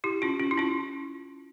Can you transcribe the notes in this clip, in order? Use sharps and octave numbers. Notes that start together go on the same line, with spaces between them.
E4 G4
C#4 F4
C#4 F4
E4
C#4 F4